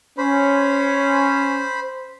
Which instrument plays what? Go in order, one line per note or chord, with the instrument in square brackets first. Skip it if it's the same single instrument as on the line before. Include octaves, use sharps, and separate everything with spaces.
[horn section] C#4 [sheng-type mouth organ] C5 B5